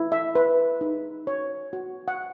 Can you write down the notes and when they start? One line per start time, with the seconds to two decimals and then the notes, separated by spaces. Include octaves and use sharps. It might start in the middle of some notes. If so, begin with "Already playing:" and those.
Already playing: E4
0.12 E5
0.35 B4
0.81 D#4
1.27 C#5
1.73 F#4
2.08 F#5